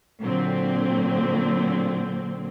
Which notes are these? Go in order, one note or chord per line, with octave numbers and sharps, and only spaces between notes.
A#2 D3 F#3 C4